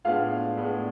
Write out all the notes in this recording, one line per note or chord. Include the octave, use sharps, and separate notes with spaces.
A2 G#3 B3 D4 F4 F5
A2 G#3 B3 D4